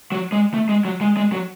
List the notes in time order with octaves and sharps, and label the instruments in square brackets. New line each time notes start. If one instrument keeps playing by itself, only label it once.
[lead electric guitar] F#3
G#3
A3
G#3
F#3
G#3
G#3
F#3